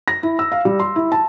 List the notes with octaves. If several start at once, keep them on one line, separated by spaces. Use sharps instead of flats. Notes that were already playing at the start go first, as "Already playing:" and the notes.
A#6
E4
E6
F5
G3
C6
E4
A5